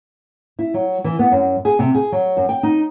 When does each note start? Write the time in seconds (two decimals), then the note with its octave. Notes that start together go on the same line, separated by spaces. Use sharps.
0.59 E4
0.74 F#3
1.04 E3
1.19 B3
1.32 F#2
1.65 G#4
1.79 C3
1.94 G#4
2.12 F#3
2.37 F#2
2.49 G5
2.63 D#4